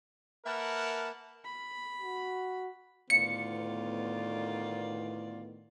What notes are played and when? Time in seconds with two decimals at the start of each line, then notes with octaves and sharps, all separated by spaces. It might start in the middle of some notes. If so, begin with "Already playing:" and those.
0.45 A#3 A#4 B4 E5 F#5 A5
1.45 B5
2.02 F#4
3.10 D2 A2 D#3 B3 F4 D5 C#7